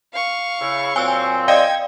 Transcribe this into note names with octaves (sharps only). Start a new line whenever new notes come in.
F5 C#6
C#3 E4
A#2 F#3 C4 G#5 E6
D5 D#5 F5 G5 G#6